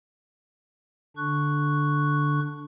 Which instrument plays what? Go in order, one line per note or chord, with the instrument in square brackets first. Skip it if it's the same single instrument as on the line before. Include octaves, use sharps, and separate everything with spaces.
[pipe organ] D3 D4 C#6 F#6